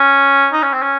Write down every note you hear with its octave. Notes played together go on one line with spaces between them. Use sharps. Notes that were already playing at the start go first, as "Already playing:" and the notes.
Already playing: C#4
D#4
C#4
C4
C#4